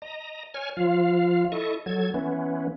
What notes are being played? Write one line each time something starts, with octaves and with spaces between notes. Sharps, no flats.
D#5 A#5
C#5 G#5 F6
F3 F4 F5
E4 A4 D#5 C#6
F#3 A4 G#6
E3 B3 C#4